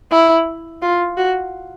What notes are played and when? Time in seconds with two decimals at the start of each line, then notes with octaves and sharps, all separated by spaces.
0.11 E4
0.82 F4
1.17 F#4